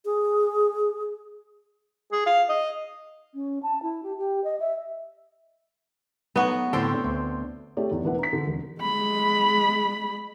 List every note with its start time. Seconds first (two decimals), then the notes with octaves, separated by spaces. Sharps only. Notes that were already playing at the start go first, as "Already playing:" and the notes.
0.05 G#4
2.12 G#4
2.26 F5
2.49 D#5
3.34 C#4
3.63 A5
3.82 E4
4.03 G4
4.17 G4
4.44 D#5
4.60 E5
6.36 F#3 A3 B3 D#4 F#4 D#5
6.73 A2 D3 C4 A4 C#5 G5
7.04 D2
7.77 A3 G4 C#5 D5
7.91 E2
8.03 E1 D4 E4 B4 F#5
8.19 A#5 B6
8.33 D3
8.47 E1
8.81 G#3 B5